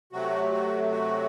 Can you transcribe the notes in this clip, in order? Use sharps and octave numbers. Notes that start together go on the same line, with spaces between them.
C3 F#3 A3 F#4
F#4
F#4